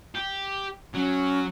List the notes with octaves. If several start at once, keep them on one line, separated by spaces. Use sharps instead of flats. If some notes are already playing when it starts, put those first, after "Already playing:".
G4
F#3 C#4